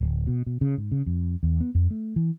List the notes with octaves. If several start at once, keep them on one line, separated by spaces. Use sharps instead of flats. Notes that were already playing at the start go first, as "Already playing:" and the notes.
D1
B2
B2
C#3
G#2
C#3
F2
E2
B3
F2
A3
E3